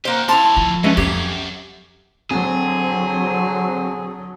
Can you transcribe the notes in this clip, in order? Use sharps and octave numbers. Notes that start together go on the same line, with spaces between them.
A#3 F#4 G4 C5
A3 E4 F5 A5 C6 D6 A6
F3
F#2 G#3 A3 C#4 B4
F2 G4 G#6 B6 C7
D3 F#3 C4 G#4